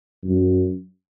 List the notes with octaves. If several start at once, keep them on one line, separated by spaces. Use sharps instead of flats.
F#2